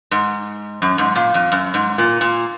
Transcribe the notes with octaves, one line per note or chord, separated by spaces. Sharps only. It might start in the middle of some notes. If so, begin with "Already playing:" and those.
G#2
F#2
G#2
A#2
F2
F#2
G#2
A#2
A#2